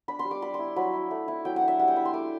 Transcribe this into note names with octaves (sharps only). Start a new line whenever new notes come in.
D4 B5
C6
G3
D6
G3 B5
C6
E4
F#3 B5
E4
A3
E4
F#3 G5
F#5
D4
E5
G3 F#5
G5
E4 B5
C6
A3 D6